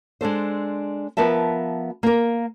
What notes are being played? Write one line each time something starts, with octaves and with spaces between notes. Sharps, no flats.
G#3 D4 A4 C5
F3 B3 A#4 E5 A5
A#3 A#4